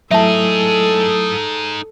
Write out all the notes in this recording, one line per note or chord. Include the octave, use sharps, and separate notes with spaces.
F#3 A3 D#4 E4 G#4 A4 E5 A5